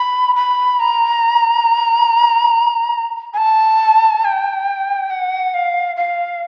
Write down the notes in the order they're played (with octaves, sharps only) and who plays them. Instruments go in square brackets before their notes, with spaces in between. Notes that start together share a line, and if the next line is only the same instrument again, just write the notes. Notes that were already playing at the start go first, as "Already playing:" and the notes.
Already playing: [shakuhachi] B5
B5
A#5
G#5
A5
G5
F#5
F5
F5